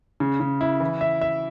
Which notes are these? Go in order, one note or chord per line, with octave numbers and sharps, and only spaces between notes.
C#3
C#3
E4
E3
E5
E5